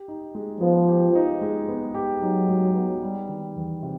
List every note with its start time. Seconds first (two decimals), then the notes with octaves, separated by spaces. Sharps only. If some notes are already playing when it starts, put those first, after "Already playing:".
Already playing: G4
0.08 D#4
0.35 G#3
0.61 F3 B3
0.88 G4
1.15 D#4
1.42 G#3
1.69 B3
1.94 G4
2.22 F#3 D#4
2.48 G#3
2.76 B3
3.02 G3
3.29 D#3
3.56 E2
3.83 C3